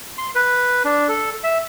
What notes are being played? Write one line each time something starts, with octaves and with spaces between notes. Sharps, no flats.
C6
B4
D4
A4
E5